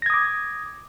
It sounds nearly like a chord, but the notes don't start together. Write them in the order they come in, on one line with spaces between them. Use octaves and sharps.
A#6 G#6 D#6 D6